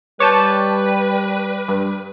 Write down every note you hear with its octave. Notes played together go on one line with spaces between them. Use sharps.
G3 B4 C#5 A5 D6 G6
G2